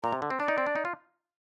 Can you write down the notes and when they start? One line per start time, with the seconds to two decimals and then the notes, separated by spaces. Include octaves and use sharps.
0.03 A#2 A#5
0.12 C3
0.22 D3
0.30 C4
0.39 D4 D5
0.48 D#4
0.58 C4
0.66 D4
0.76 D#4
0.85 F4